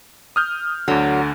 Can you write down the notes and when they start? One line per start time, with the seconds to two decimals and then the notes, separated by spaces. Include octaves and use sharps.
0.36 D#6 F6 G6
0.88 D2 D3 F#3